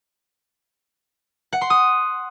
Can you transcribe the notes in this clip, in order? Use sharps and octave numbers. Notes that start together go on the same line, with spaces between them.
F#5
C6
D#6